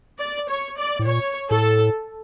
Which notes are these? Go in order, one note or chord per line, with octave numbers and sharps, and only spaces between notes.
D5
C#5
D5
A2
A#2 C#5
A2 A4